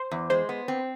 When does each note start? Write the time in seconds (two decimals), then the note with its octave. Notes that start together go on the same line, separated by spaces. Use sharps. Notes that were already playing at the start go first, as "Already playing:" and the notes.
Already playing: C5
0.11 E2
0.30 G#3 C5
0.49 B3
0.68 C4